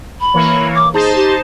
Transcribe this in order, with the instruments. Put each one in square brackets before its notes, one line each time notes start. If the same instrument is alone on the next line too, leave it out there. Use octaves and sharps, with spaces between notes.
[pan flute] B5
[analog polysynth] E3 A#3 C#5
[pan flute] D6
[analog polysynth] D#4 C5 A5 [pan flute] G#4
[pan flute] G4